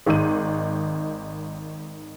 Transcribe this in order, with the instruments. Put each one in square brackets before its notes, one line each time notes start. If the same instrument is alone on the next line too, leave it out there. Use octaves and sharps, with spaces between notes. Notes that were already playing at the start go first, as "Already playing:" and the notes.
[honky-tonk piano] G#1 D#3 D#4 D#7